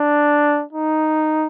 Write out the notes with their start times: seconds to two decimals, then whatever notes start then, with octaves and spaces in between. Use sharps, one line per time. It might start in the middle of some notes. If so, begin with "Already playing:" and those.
Already playing: D4
0.73 D#4